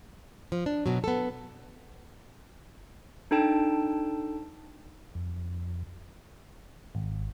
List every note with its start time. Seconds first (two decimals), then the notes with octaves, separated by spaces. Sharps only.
0.52 F3
0.66 D4
0.86 B2 F#3
1.04 B3 A4
3.31 D4 D#4 A4 G5 A5
5.15 F2
6.95 G#1